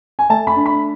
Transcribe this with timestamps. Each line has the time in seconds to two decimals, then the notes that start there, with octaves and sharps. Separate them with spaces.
0.19 G#5
0.30 A3 A5
0.47 B5
0.56 D4
0.66 B5